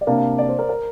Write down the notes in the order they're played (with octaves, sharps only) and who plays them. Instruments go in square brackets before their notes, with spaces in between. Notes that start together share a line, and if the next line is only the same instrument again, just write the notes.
[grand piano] D5
[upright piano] C3 A#3 D4 [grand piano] F5
[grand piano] F5
D5
C5
A#4
A#4